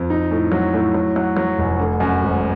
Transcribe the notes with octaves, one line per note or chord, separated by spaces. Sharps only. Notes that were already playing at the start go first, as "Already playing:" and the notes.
Already playing: F2
D#4
A2
F#3
A2
F#3
F#3
F#3
F1
D3
F#2
G#1